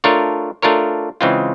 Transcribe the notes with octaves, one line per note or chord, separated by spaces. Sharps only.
A3 D4 F4 A#4 C#5
A3 D4 F4 A#4 C#5
C#3 E3 G#3 C4 F4